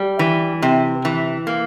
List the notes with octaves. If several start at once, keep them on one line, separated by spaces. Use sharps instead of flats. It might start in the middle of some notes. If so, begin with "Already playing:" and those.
Already playing: G3
E3
C3
E3
A#3